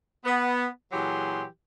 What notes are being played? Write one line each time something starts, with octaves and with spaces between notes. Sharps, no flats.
B3
A#2 E3 F#3 G4 G#4 C6